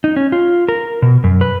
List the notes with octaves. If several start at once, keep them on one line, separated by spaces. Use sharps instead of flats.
D#4
C#4
F4
A#4
B2
F#2
B4